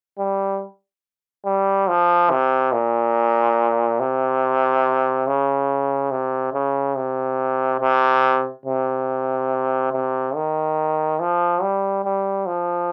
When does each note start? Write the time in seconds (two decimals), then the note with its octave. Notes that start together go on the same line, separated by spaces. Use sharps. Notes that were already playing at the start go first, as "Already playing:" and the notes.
0.19 G3
1.46 G3
1.88 F3
2.30 C3
2.73 A#2
4.00 C3
5.27 C#3
6.11 C3
6.53 C#3
6.96 C3
7.81 C3
8.66 C3
9.93 C3
10.35 D#3
11.20 F3
11.62 G3
12.04 G3
12.47 F3